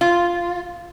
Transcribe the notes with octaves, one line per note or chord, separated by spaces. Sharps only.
F4